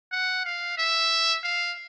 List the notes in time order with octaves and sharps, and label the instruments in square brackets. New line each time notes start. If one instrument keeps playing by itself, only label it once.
[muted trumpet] F#5
F5
E5
F5